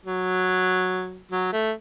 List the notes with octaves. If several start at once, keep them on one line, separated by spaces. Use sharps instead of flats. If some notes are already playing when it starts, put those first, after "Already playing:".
F#3
F#3
A3